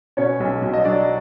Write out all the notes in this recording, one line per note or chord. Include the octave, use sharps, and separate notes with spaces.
B2 C#4 C#5
B1
B1
D#5
F#3 D4 D5